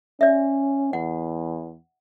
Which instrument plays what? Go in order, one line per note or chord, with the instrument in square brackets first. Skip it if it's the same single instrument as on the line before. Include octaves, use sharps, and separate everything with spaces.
[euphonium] C#4 [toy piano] D5 E5
[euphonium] E2 [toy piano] F#5